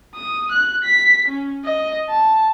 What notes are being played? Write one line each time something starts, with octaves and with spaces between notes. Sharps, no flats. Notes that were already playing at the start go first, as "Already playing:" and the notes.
D#6
F#6
B6
C#4
D#5
A5